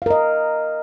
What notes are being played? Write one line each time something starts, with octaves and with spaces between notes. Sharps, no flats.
A#4 D#5 F5